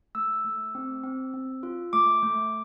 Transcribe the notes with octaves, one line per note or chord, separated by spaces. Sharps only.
A3 E6
A3
C4
C4
C4
F4
A3 D6
A3